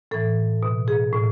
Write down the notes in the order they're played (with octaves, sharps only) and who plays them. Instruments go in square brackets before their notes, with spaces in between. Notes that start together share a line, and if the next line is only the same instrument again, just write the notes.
[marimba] A2 E3 A4
B2
G#4
A2